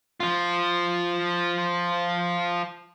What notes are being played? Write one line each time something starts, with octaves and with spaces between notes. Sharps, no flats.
F3 F4